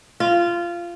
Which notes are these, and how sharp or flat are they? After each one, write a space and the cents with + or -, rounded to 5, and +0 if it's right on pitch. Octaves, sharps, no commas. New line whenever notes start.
F4 -15